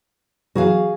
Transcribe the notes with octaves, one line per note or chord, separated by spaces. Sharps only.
B2 E3 F#3 F#4 G#4 F5